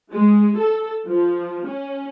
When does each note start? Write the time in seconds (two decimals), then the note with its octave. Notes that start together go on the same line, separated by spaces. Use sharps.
0.12 G#3
0.57 A4
1.07 F3
1.66 C#4